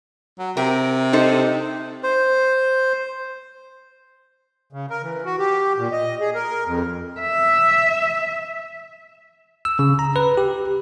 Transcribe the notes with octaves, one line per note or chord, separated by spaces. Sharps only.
F#3
C3 A#4
D#4 A4 C5
C5
C#3
A#4
E3
F#4
G4
A#2
D#5
G#4
A#4
F2
E5
E6
C#3
A#5
B4
G4